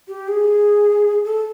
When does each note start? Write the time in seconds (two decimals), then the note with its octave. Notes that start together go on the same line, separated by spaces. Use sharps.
0.08 G4
0.28 G#4
1.24 A4